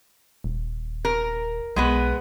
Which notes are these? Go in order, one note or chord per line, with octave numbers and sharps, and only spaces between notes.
D#1
A#4
B1 G#3 B3 B4